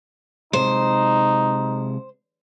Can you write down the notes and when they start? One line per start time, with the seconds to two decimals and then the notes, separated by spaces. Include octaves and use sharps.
0.53 C3 G#3 D#4 C5